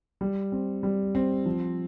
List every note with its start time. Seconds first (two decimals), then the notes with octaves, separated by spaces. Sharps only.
0.21 G3
0.52 C4
0.83 G3
1.15 C4
1.46 F3